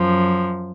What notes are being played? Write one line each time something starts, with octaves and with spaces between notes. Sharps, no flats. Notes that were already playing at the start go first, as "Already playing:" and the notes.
Already playing: F#2 F3